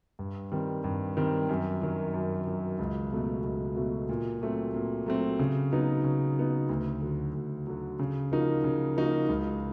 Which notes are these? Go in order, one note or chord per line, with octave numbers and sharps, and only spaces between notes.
G2
D#3 G3 C4
G2
D#3 G3 C4
F#2
D#3 F#3
F#2
D#3 F#3
C#2
B2 F#3 A3
C#2
B2 F#3 A3
A#2
F#3 A3 C4
A#2
F#3 A3 C4
C#3
F#3 B3 D#4
C#3
F#3 B3 D#4
D2
D3 F#3
D2
D3 F#3
C#3
F3 A#3 D#4 F#4
C#3
F3 A#3 D#4 F#4
C#2